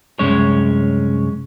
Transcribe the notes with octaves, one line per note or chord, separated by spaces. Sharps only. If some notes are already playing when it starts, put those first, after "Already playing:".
C2 F#2 G#3 C#4 C#5